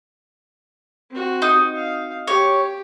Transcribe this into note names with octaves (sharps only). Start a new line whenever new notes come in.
C4 F#4
D#4 D#6
F5
G4 C#5